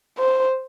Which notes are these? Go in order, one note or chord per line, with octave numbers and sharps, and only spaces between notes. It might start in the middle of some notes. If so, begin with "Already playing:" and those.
C5